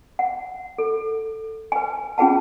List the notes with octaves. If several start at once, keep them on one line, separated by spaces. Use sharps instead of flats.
F#5
A4
B4 G#5
C#4 F4 G#4 B4 F#5 A5